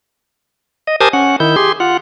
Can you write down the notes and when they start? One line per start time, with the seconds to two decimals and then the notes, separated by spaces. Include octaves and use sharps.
0.87 D#5
1.00 G4 A#4 C5 G#5 A5 D#6
1.13 C#4 F#5
1.40 D#3 E4 G6
1.56 G4 G#4 C6
1.80 F4 F#5